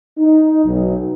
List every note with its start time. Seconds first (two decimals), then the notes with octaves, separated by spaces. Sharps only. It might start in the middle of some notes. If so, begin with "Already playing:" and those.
0.18 D#4
0.65 B1